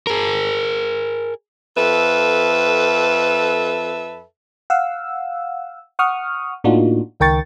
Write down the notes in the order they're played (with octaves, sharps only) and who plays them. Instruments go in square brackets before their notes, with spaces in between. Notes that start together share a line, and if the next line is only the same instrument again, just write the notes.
[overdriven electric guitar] G#4 A#4
[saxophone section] F2 A4 B4 E5
[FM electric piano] F5 F#5 E6
F#5 C#6 D#6 F6
A2 A#3 D4 D#4 F4 F#4
C#2 D#3 A#4 G5 C#6 A6